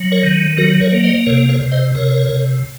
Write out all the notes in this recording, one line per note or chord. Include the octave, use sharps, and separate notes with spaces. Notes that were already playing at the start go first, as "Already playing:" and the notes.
Already playing: F#3
A#4 C#5
D#3
F#3 F#4 A#4
A#4 C#5
A#3
C5 D#5
C3 A#4 C#5
A#4 C#5
C3
C5 D#5
C3 A#4 C#5
C3